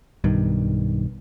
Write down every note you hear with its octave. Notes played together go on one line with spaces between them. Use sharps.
B1 G2 D#3